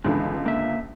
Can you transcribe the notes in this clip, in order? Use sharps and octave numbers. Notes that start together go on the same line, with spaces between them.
G1 C#2 D3 E3 G#3
A#3 E5